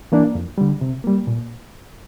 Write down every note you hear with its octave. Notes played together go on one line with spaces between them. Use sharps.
E3 A#3 D4
F2
D3 G3
C3
G3 A#3
A#2